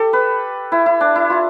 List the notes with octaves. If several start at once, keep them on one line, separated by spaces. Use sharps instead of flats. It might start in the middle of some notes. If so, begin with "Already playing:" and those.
Already playing: G4 A4
B4
E4
E4
D4
E4
F4